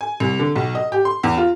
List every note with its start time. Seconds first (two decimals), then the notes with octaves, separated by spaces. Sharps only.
0.01 G#5
0.20 C2
0.39 D3
0.56 B1
0.75 D#5
0.92 G4
1.05 C6
1.23 E2
1.37 F4